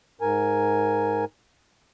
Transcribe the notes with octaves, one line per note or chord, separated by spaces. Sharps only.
G#2 A#4 G#5